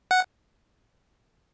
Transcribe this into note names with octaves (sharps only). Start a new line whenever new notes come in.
F#5